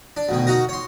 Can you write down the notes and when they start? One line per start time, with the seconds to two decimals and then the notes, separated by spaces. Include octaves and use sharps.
0.17 D4
0.29 D2 B2 D#3
0.47 D#4 F#4 A#4
0.69 C#5 C6